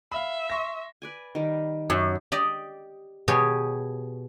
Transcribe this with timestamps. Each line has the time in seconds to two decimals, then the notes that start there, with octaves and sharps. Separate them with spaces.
0.12 E5 F5 B5
0.50 C6 C#6 A#6
1.02 B4 D5 G#5
1.35 D#3 G3
1.90 F#2
2.32 G4 D5 D#5
3.28 B2 G4 G#4 C#5